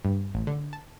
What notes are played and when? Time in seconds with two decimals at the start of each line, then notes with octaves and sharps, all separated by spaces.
0.05 G2
0.34 A1
0.47 D3
0.73 A5